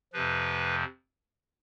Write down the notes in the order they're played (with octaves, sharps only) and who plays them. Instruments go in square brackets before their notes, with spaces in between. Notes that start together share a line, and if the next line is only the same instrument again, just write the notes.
[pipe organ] F2 C3 F3 B4